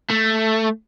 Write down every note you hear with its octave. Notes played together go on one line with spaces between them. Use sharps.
A3